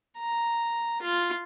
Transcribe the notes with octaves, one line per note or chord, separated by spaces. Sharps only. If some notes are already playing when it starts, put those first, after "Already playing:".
A#5
F4